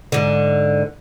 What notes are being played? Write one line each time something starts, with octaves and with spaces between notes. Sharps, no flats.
G#2 D3